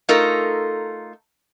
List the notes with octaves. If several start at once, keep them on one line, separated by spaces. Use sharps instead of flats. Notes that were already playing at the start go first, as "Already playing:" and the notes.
A3 D#4 F4 A4 A#4